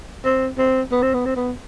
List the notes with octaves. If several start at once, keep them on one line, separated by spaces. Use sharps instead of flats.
C4
C4
B3
C4
B3
C4
B3